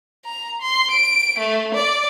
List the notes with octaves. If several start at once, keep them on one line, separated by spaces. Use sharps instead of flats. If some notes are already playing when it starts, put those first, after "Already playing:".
A#5
C6
D7
A3
D5